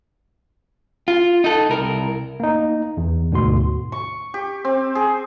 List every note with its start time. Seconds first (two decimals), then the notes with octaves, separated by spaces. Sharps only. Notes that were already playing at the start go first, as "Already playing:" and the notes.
1.08 F4
1.44 D#4 A4
1.70 C2 A#4
2.40 A#3 D#4
2.97 E2
3.32 D2 G#2 B2 F#4 C6
3.92 C#6
4.34 G4
4.64 C4
4.95 G#4